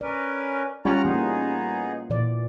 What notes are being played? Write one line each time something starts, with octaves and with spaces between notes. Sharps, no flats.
C#4 A#4 B4 D5
G3 C#4 F4 D5 F#5 A#5 F6
E3 A#3 B3 D#4 G#4
A#2 E3 D5